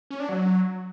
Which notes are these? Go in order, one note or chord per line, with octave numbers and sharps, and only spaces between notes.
C#4
D4
F#3